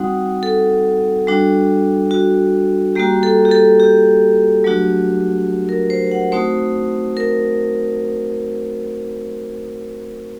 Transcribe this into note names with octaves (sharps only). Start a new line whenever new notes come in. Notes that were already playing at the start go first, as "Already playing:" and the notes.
Already playing: G3 C4 D#4 F#4 F#5
A4
G3 D4 F#4
F#4
G3 A#3 F#4 G4
A4
G4
A4
G4
F#3 A3 D4 F#4
A#4
C5
F#5
A3 C4 D#4 F#4 C5
A#4